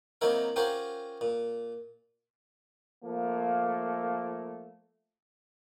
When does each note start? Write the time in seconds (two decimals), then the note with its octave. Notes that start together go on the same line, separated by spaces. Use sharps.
0.21 C3 F#3 A#3 D#4 E4 A#4
0.56 C#4 F4 G4 A#4 C5 F#5
1.21 A#2
3.03 F3 A3 A#3